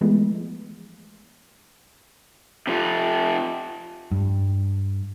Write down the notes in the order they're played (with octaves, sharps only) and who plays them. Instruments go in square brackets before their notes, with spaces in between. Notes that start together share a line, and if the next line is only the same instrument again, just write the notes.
[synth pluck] E3 F3 G#3 A3 B3
[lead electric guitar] C3 F3
[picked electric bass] G2